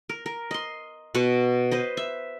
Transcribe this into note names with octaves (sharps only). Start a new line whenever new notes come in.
A#4
A#4
D#5 C6
B2 F#4 B4 C#6
B4 C5 D#5
E5